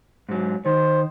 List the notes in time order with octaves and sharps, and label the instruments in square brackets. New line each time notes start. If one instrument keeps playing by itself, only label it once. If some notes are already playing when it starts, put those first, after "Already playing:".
[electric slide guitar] G#2 F#3
[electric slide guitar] D#3 [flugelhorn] C5